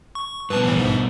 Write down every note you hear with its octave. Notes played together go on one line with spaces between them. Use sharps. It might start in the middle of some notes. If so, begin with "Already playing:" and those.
C#6
G2 B2 B4 A5
A2 E3
A#1 G#2